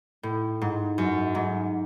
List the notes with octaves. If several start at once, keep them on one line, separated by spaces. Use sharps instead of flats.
A2
G#2
F#2
G#2